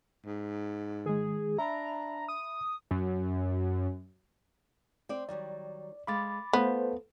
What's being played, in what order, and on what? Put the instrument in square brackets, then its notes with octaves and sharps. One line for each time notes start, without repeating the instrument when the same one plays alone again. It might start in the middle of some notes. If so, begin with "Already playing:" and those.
[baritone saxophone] G#2
[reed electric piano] D#3 G#3 [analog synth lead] G#4
[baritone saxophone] D4 [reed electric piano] E5 B5 [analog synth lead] A#5
[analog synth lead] D#6
[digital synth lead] F#2
[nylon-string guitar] C4 C5 D5
[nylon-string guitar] D#3 F#3 G3 [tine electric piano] D5
[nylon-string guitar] G#3 F5 [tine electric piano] B5 D6 A6
[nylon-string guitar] A3 F4 [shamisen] B3 [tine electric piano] B4 C5